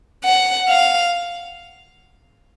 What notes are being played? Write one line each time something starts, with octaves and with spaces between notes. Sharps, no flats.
F#5
F5